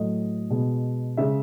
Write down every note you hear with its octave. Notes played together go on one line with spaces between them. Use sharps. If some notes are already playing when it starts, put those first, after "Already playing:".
Already playing: A2 F#3 A3 D#5
B2 G#3
C#3 G#3 E5